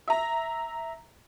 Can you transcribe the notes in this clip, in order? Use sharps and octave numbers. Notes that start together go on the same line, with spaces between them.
E5 A#5